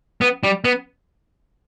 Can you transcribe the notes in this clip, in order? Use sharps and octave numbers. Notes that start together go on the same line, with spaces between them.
B3
G3
B3